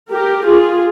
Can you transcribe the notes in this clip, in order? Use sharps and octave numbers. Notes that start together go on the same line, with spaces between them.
G4 A#4
F4 G#4